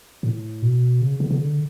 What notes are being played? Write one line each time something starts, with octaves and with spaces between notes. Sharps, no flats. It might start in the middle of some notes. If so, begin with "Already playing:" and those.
A2
B2
C#3
C#3
C#3
D3